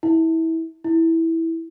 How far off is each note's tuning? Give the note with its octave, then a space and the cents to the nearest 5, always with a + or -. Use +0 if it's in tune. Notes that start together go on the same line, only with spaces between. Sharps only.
E4 -25
E4 -10